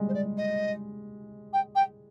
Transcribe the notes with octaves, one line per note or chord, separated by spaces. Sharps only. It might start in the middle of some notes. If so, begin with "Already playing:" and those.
Already playing: G3 G#3
C5
D5
D#5
G5
G5